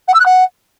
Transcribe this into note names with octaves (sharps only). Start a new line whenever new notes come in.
F#5
E6
F#6
F#5